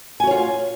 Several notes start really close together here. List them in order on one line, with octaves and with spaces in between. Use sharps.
G#5 F#4 C#5 F4